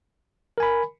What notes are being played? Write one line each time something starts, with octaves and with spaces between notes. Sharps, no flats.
A#4 G#5 B5